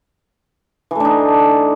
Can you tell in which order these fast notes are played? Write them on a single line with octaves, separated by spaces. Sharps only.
E3 A3 D4 D#4